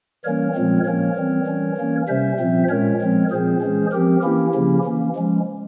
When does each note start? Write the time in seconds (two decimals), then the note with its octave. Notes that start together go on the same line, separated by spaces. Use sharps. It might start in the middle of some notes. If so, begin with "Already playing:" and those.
0.25 E3 G3 A#3 C#4 A#4 C#5
0.54 A#2 F3 G#3 C4
0.85 F3 A#3 C#4 A#4 C#5
1.15 E3 G3 C4
1.46 E3 G3 C#4
1.77 E3 A#3 C#4
2.08 C3 G3 C#4 C5 E5
2.39 A#2 F3 C4
2.69 A#2 G#3 C#4 A#4 C#5
3.01 F3 G#3 C4
3.31 A#2 F3 C4 G#4 C5
3.61 E3 G#3 C#4
3.92 F3 C4 G4 A#4
4.23 E3 A#3 C#4 E4 G4
4.54 C#3 F3 A#3 C#4
4.84 E3 A#3 C#4
5.15 F3 G#3 C#4